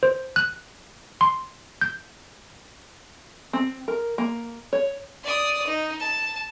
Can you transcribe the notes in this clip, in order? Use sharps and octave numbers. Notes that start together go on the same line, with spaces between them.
C5
F#6
C6
G6
C4
A#4
A#3
C#5
D5 D#6
D#4
A5